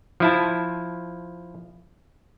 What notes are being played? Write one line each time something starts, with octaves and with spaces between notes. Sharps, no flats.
F3 E4 A5